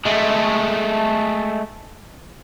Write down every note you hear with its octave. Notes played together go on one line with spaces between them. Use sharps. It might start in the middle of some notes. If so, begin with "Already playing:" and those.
G#3 A3